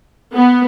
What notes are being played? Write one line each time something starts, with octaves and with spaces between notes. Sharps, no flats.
B3